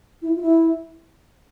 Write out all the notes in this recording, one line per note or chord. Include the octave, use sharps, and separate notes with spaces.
E4
F4
E4